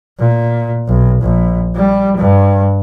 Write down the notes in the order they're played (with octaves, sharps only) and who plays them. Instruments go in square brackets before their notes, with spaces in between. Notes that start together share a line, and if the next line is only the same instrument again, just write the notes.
[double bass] A#2
B1
A#1
G3
G2